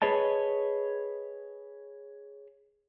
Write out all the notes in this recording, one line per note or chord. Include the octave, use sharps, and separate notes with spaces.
G#4 B4 C#5 D#5 A5